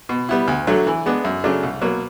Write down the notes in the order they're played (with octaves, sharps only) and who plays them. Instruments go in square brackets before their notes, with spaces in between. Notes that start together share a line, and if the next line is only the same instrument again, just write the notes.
[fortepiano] B2
G3 B3 E4
D2
D3 F#3 A3
E3
G#3 B3 D4
F#2
C#3 F#3 A3 D4
C2
B2 F#3 A#3